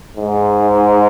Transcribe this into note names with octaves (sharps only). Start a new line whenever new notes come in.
G#2